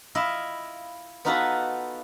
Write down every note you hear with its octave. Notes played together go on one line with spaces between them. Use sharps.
E4 F4 D#5 E5
B3 D#4 F4 F#4 A4 B4